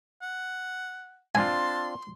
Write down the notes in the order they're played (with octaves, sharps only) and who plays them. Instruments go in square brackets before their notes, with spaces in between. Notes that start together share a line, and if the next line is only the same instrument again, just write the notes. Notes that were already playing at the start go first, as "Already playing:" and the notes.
[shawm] F#5
[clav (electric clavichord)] C4 D4 F4 [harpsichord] G#5 [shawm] A5 [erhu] C6